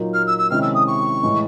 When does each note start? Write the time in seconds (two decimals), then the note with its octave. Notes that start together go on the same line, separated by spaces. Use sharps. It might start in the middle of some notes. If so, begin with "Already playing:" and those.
Already playing: A#2 F#3 A#3 D#4
0.13 F6
0.27 E6
0.38 E6
0.50 C3 D#3 G#3 C#4 E4 F6
0.62 E6
0.74 D#6
0.87 C#6
1.23 A2 E3 G#3